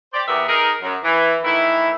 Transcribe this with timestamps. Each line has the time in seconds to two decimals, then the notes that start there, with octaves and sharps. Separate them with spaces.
0.13 G4 C5 D5
0.27 E2 C3 B3 G4 A#4 E5
0.48 D#4 G#4 A#4
0.82 F#2
1.03 E3
1.44 D#3 E3 A3 E4